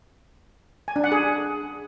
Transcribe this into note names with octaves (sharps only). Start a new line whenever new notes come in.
G#5
D4
F#5
G#4